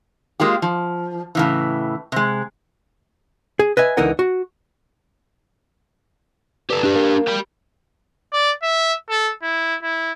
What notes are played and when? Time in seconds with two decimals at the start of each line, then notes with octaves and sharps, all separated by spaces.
0.40 G#3 A#3 F4 G4
0.62 F3
1.35 A2 C#3 E3
2.12 C3 G#3
3.59 G#4
3.77 B4 D#5 E5 G#5
3.97 C#2 D3 E3 D#4 A#4 F#5
4.19 F#4
6.70 G2 G4 A4
6.83 D4 G4
6.95 A#3
7.27 G4 B5
8.33 D5
8.63 E5
9.10 A4
9.43 E4
9.83 E4